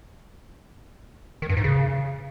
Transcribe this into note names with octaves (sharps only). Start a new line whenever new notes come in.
D#3
G2
G#2
C#3